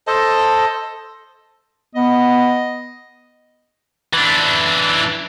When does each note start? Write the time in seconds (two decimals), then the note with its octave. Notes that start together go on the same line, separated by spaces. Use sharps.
0.07 A4 C5 D#5 A5
1.95 B3 D#5
4.13 E3 D4